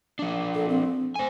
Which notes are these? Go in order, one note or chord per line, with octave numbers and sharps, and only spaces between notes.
F3 D4
A4
C4
C5 G#5